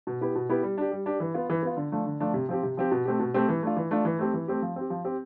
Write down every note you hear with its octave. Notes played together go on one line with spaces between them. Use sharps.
B2
B3 E4 G4
B2
B3 E4 G4
G3
D4 G4
G3
D4 G4
E3
B3 F4
E3
B3 F4
D3
F3 A3 D4
D3
F3 A3 D4
C3
F3 C4 G4
C3
F3 C4 G4
B2
A3 C4 G4
B2
A3 C4 G4
E3
A3 D4 F4
E3
A3 D4 F4
E3
A3 C4 G4
E3
A3 C4 G4
F3
C4 G4
F3
C4 G4